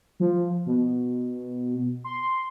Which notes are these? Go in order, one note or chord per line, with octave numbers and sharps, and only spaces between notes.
F3
B2
C6